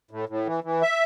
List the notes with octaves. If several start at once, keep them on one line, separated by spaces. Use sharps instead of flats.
A2
A2
E3
E3
E5